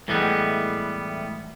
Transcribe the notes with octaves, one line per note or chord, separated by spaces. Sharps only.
A2 E3 G3 G#3 B3